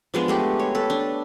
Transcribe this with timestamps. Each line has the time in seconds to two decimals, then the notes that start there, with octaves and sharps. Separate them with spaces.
0.14 F3 G#3 B3 D4
0.28 G#3 A3 G4
0.59 C#5
0.75 A4 B4
0.90 D4